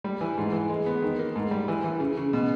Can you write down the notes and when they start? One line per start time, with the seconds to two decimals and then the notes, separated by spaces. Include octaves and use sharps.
0.04 G3
0.21 E3
0.38 G#2
0.53 E3
0.70 G#3
0.86 B3
1.02 D#3
1.19 A#3
1.36 G#2
1.51 G3
1.68 E3
1.84 E3
2.00 C#3
2.17 C#3
2.33 B2